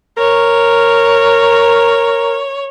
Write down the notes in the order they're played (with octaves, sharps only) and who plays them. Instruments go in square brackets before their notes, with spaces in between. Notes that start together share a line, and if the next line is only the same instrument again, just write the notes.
[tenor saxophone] A#4 [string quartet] C#5